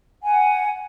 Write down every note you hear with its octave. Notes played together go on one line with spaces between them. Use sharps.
F#5 G#5